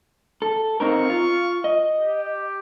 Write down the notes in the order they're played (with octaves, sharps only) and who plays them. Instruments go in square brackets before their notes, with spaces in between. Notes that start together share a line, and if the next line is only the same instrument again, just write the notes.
[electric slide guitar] A4
[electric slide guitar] C4 D#4 A#4 [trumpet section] F5 C#6
[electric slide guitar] F4
D#5
[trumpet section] G4